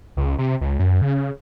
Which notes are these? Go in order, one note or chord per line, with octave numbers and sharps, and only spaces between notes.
C#2
C3
C#2
F#2
C#3